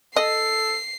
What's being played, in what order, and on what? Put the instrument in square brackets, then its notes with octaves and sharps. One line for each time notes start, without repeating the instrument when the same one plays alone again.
[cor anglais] A4 [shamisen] D#5 [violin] C7